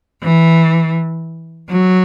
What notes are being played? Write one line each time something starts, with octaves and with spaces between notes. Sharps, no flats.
E3
F#3